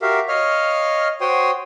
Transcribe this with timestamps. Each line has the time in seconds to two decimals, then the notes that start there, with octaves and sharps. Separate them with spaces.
0.02 F#4 G4 A#4 E5 F5
0.28 C#5 D#5 F5 F6
1.21 F#4 C5 C#5 G5 C6 D#6